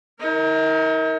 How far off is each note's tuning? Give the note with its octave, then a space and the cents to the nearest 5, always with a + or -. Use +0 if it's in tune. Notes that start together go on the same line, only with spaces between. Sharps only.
D#4 +45 A#4 +0